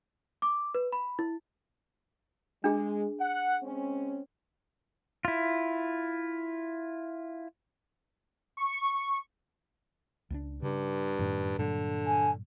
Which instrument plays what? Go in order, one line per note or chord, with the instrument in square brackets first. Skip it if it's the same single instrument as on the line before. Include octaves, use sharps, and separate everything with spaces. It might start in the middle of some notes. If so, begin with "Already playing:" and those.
[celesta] D6
B4
B5
E4
[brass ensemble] G#3 [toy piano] D4 G#4
[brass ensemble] F#5
G#3 C4 C#4
[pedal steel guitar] E4 F4
[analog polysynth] C#6
[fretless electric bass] C#2 F#3 D4
[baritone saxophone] G2 [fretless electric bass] C#3
[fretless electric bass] F#2 A2 D#3
[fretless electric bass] G2 A#2 F#3 [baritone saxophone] D3
[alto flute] G#5